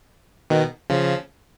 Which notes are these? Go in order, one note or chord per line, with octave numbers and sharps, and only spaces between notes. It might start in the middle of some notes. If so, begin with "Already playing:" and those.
B2 D#3
C#3 F3